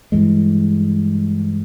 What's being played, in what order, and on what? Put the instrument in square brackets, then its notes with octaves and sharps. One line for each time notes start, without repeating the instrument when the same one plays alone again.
[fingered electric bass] G2 E3 G#3